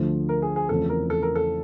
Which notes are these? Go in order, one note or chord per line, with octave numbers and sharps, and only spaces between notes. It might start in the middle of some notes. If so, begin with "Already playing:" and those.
Already playing: D2 D3 F3 A3
A#4
G#4
G#4
E2 C#3 F3 A3 C4 A4
A#4
A4
A#4
A4